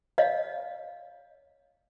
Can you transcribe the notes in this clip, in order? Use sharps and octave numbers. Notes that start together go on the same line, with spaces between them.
C#5 D#5 F5